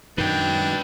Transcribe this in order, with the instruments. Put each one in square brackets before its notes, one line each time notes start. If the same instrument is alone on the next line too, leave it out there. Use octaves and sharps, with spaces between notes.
[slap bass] F#2 D#3 [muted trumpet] D4 [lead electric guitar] B4 G5